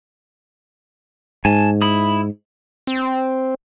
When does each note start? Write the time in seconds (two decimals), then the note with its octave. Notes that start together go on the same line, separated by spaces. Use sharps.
1.45 G#2 G#5 A5
1.82 E4 B5 D#6
2.87 C4